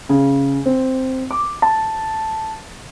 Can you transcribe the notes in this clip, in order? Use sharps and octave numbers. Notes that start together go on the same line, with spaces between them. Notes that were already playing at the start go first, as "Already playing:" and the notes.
C#3
C4
D6
A5